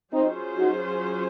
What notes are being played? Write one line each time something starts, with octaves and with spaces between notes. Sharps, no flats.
F#3 C4 C#4 D#4 F4 G#4 C5
D#4 F#4